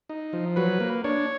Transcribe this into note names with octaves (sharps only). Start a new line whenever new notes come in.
D#4
F3
F#3 B4
A#3
D4 C#5